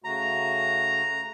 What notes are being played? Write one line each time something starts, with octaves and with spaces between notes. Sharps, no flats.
C#3 A3 F#4 A#5